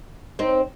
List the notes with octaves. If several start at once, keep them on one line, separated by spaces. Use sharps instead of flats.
C4 D#4